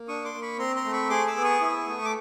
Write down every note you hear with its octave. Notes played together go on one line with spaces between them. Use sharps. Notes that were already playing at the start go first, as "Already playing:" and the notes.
Already playing: A#3
D4 C#6 D#6
C6 D6
A#3
B5 C#6
C4 A#5 C6
A#5 C6
A3
B5 C#6
G#4 C6 D6
D6 E6
B3
C#6 D#6
E4
A3
D6